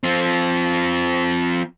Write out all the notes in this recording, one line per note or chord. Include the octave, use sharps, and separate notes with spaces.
F3 C4